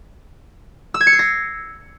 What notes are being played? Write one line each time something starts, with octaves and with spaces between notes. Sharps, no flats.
E6
G#6
C#7
C7
A#6